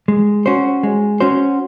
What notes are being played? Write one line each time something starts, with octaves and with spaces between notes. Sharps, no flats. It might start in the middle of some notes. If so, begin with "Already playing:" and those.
G#3
C#4 F#4 C5
G#3
C#4 F#4 C5